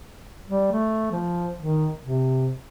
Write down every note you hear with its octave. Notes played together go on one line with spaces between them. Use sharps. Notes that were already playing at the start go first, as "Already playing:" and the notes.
G3
A3
F3
D#3
C3